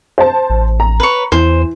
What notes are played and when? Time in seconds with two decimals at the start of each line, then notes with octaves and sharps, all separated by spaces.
0.18 C5 A5
0.50 A1
0.80 A#5
1.00 B4 C#5
1.32 E2 E3 C5